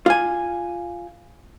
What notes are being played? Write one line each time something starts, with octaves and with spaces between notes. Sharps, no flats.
F4 G#5